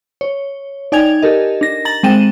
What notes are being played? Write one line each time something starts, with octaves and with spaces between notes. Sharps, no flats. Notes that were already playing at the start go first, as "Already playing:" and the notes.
C#5
D#4 D5 G5 G#5 G#6 F7
G4 A4 A#4 D#5
D4 A#6
A#5 A6 F#7
G#3 C4 G5 D#7 E7